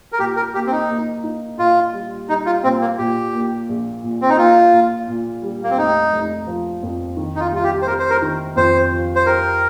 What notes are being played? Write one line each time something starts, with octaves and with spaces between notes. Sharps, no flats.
A#4
A#2 G4
A#4
A#3 G4
C4
D#4
A#3
D#4
A#2 F4
G3
G3 D#4
F4
A#2 C4
A#3
A#2 G4
A#3
A#1
A#2
C4
D#4
A#3 F4
A#2
A#2
G3
A#3
C4
F1 D#4
F1
F3
F2
D#3
D#4
F4
C2 F4
G4
C5
C2 A#4
C5
A#4
D#3
F2 C5
F3
C5
G4 A#4